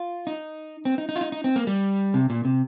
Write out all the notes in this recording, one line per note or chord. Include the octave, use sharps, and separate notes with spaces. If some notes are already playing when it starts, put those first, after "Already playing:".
Already playing: F4
D#4
C4
D#4
D#4
F4
D#4
D#4
C4
A#3
G3
C3
A#2
C3